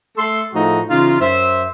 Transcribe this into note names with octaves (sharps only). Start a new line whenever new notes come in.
A3 A4 C6
A2 F3 A3 D#4 F#4 G#4
C#3 E3 D#4 F4
F#2 C5 E5